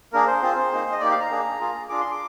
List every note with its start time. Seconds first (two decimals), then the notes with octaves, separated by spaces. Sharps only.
0.13 A#3 D4 G#4 A#4
0.27 C5
0.42 C4 F4 G#4
0.72 A#3 D#4 G#4
0.92 D#5
1.00 A#3 D#4 G4 D5
1.11 F5
1.21 A#5
1.30 A#3 D4 G#4
1.60 A#3 F4 G#4
1.89 D4 F4 G#4 D6
2.00 C6
2.11 D6